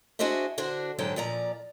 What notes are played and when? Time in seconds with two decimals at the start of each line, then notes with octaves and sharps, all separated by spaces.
0.19 D4 F#4 G#4 C5 D#5 E5
0.58 D3 D4 F#4 C5
0.99 G#2 D3 F#3 A4 G5
1.16 A#2 F3 D5 A#5